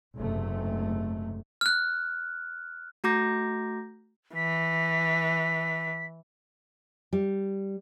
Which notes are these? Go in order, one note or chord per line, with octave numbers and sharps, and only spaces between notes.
F#1 G#2 C3 A3
F6 F#6
A3 F#4 A#5 D6 G6 A#6
E3 B6
G3